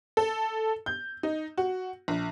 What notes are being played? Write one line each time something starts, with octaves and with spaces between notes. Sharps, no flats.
A4
G6
D#4
F#4
A#1